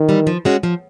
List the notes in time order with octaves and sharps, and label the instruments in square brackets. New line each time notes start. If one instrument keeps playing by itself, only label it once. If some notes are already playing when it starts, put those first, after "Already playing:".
Already playing: [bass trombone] D#3
[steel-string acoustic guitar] E3 G3
F3
G#3 C#4 F#4
F3